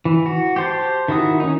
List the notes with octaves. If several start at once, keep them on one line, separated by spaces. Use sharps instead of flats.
E3
F#4
G4 C5 A5
D#3 E4 F#4 D#6
C#4 D#4